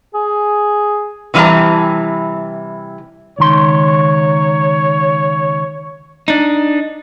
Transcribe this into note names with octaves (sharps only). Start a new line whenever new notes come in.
G#4
C3 E3 G3 E4 A5 A#5
C#2 D#3 C#5 C6
D4 D#4